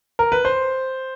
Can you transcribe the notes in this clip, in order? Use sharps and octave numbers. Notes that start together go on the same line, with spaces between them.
A#4
B4
C5